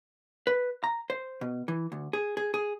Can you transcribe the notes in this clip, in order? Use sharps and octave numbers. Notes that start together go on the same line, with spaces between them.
B4
A#5
C5
B2
E3
D2
G#4
G#4
G#4